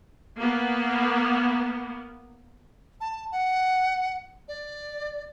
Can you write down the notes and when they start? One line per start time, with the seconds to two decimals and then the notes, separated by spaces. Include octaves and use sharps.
0.37 A#3 B3
3.01 A5
3.32 F#5
4.48 D5